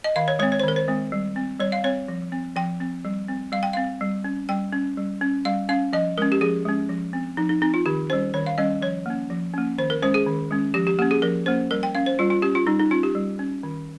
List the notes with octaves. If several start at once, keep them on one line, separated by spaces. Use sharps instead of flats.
D#5
D#3 F5
C#5
G#3 C4 C#5
C#5
C5
D#3 A#4
C5
G#3 C4
G3
C4
G3 C#5
F5
C4 C#5
F3
C4
F3 G5
C4
G3
C4
G3 F5
G5
C4 F5
G3
C#4
G3 G5
C#4
G3
C#4
G3 F5
C#4 F5
F3 D#5
G#3 C#4 A#4
G4
F3 G#4
G#3 C#4
F3
C4
F3 D#4
D#4
C4 D#4
F4
D#3 G4
G3 C#4 C5
D#3 C#5
F5
G3 C#4 D#5
F3 C#5
A#3 C#4
F3
A#3 C#4
D#3 C5
A#4
G#3 C#4 C5
G#4
D#3
G#3 C#4
F3 G4
G4
A#3 C#4 G4
G#4
F3 A#4
A#3 C#4 C5
G3 A#4
G5
C#4 F5
C5
G3 F4
F4
C#4 G4
F4
G3 D#4
D#4
C#4 F4
G4
G3
C#4
D#3